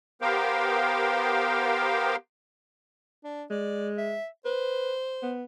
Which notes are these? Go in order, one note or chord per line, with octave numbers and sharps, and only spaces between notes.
B3 G4 A#4 C5 F5 G5
D4
G#3 D5
E5
B4 C5
B3